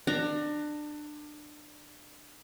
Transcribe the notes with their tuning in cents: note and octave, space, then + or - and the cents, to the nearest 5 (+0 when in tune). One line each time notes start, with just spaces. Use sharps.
D4 +25 A#5 +0